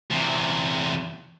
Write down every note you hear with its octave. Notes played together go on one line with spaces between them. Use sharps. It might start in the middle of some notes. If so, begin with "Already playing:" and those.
E2 C3